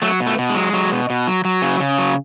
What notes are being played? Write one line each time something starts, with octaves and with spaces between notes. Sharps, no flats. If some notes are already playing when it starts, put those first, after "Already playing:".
F#3 A3
B2
A3
B2
G#3
F#3
F#3
B2
B2
F#3
F#3
C#3
C#3
F#3